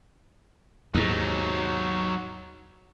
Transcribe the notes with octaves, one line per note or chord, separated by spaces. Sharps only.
D#2 G#2 F#3 D#4